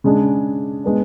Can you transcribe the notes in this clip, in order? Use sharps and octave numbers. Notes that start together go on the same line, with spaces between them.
C#3 G#3 D4 G#4
G#3 B3 D4